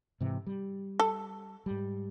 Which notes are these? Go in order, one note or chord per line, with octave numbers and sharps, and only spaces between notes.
G#2 C3 E3
G3
A4
G#2 G3